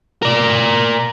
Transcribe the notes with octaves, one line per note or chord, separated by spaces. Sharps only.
A#4 D5